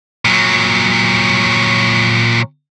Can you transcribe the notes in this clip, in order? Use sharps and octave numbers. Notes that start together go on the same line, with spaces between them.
A#2 F#3